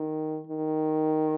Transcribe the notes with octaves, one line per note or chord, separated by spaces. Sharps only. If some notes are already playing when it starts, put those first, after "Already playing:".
Already playing: D#3
D#3